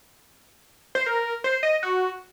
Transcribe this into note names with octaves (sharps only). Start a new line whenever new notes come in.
C5
A#4
C5
D#5
F#4